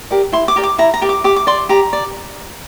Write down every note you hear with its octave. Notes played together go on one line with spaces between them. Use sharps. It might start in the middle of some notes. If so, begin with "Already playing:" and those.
G4 A#4 D5
E4 C6
D6
G4 A#4 D5
D6
E4 A#5
A#5
G4 A#4 D5
D6
G4 D6
D6
D5 C6
G4 A#5
D5